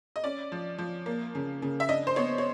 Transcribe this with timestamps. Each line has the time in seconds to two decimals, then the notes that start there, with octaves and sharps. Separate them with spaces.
0.16 D#5
0.24 C#4 D5
0.52 F3
0.78 F3
1.06 A#3
1.35 C#3
1.62 C#3
1.80 E5
1.89 D4 D#5
2.07 C5
2.16 B3 C#5
2.38 C#5